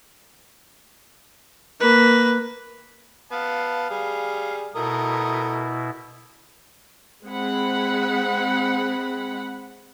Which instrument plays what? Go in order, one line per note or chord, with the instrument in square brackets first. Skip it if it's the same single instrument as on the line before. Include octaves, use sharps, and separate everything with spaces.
[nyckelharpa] A#3 B4
[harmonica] B3 A5 [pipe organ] F5
[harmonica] G3 G#4
[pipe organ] B2 E4 [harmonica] A3 A#4 D#6
[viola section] G#3 C4 G#4 F#5 B5